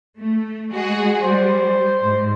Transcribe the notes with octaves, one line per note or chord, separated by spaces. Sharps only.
A3
G#3 F#4 G#4
G3 C5
G#2